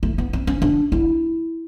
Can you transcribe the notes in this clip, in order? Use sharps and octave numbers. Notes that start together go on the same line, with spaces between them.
A3
B3
C4
C#4
D4
E4